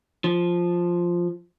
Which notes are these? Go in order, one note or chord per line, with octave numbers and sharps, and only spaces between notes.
F3